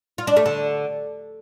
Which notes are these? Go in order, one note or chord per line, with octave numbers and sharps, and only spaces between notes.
F4
D4
A3
D3